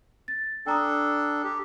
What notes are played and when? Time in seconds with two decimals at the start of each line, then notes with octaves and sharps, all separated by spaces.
0.28 A6
0.66 D4 A4 G5 A#5 D#6
1.44 G4